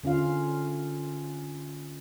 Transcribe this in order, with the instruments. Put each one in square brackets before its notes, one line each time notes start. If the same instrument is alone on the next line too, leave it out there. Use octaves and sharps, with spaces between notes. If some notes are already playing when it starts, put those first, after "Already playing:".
[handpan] D3 C#4 F4 F5